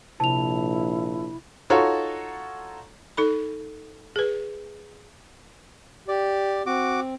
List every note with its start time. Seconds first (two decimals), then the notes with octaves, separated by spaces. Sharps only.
0.20 A#1 C3 E4 A5 F7
1.70 D#4 F4 F#4 A4 C#5 A#5
3.17 D#4 A4 B5
4.16 G#4 B4
6.08 G4 D5
6.66 C4 F#4 D6